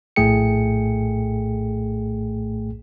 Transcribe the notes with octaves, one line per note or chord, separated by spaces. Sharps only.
A#1 A2 A3 G#4 G5 C#7